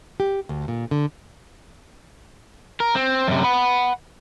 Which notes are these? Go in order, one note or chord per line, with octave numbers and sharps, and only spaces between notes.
G4
D2
A#2
D3
A#4
C4
F#2 C3
F#5 B5